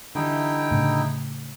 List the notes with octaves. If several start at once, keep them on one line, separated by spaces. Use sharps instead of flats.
D3 E3 G3 D#4 E4 G5
A2 C#3